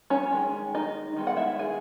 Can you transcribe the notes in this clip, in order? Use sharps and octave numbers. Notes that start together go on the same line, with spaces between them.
C#4 C#5
D#3 G#3
D#4 D#5
D#3 G#3 B3
F#5
E4 E5
G#4 G#5